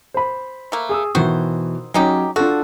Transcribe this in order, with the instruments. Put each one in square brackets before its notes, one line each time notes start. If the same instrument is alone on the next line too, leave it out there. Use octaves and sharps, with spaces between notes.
[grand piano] C5 B5
[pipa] A3 A#3
[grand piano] G#4 D#6 E6
[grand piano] B2 E3 [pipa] D#3 F#4 C5
[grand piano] F#3 C#4 [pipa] G#3 D#4 G4
[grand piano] D4 F4 A4 [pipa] F#4